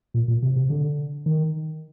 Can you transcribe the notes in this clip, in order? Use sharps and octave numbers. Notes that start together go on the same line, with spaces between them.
A#2
A#2
C3
C3
D3
D#3